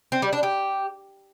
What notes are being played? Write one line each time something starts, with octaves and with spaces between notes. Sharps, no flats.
C4
G3
D4
G4